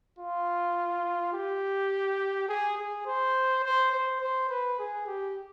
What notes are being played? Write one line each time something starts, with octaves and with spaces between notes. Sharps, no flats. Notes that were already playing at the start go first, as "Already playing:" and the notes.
F4
G4
G#4
G#4
C5
C5
C5
C5
B4
G#4
G4